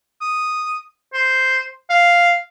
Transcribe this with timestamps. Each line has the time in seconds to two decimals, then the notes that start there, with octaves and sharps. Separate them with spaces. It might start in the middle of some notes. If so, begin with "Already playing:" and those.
0.22 D#6
1.14 C5
1.90 F5